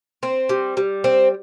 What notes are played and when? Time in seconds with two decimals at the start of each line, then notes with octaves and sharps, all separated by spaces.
0.23 C4
0.49 G3
0.77 G3
1.04 C4